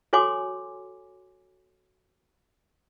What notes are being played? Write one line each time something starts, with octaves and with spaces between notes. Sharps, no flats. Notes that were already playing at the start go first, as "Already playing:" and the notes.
F#4 A4 C#5 G#5 C6 D6